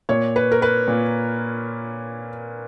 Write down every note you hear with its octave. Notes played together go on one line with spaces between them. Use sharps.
A#2 C#5
B4
A#4
B4
A#2